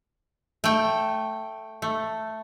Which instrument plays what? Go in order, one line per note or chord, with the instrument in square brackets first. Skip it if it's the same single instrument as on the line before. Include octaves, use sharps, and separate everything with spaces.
[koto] A3 G5
A3